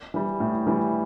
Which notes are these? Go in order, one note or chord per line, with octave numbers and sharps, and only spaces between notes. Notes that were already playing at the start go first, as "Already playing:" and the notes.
E3 G3
A2
E3 G3